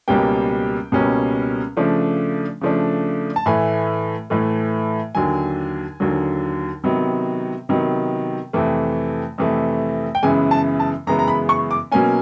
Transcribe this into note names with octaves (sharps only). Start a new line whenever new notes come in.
C#2 B2 G3 A#3 C#4 G5
C#2 B2 G3 A#3 C#4
C#3 F3 A3 D4
C#3 F3 A3 D4
A5
A2 E3 A3 G#5
A2 E3 A3
D#2 D3 F#3 G#5
D#2 D3 F#3
C3 D#3 F#3 B3
C3 D#3 F#3 B3
F2 C3 E3 A3
F2 C3 E3 A3
G5
F#2 C#3 E3 G#3 B3 G#5
A5
A5
F#2 C#3 E3 G#3 B3 A#5
A#5
B5
C#6
D6
B2 F#3 A#3 C#4 G#5